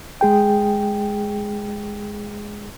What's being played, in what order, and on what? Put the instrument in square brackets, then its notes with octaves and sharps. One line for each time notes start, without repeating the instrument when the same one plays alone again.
[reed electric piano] G#3 G#4 G5